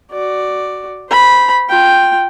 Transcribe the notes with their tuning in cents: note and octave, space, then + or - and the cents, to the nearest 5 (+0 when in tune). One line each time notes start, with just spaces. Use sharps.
F#4 +15 D5 +5
C5 -25 B5 -10
F4 +10 G5 +0